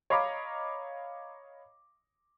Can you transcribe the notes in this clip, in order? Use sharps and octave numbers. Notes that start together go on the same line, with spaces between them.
C#5 D#5 F5 A#5 B5 D6